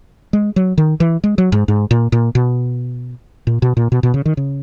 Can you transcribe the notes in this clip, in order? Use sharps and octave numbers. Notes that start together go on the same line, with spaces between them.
G#3
F#3
D#3
E3
G#3
F#3
G#2
G#2
A#2
A#2
B2
A#2
B2
A#2
B2
B2
C#3
D#3
C#3